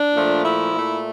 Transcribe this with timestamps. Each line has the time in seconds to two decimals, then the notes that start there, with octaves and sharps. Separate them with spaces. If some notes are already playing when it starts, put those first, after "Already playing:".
Already playing: D4
0.13 A#2 F3 A3
0.43 E4
0.73 A#2 A3